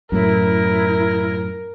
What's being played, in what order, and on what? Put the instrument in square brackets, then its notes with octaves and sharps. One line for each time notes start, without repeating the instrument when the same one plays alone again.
[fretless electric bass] F#2 A2 [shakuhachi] E4 [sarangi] A#4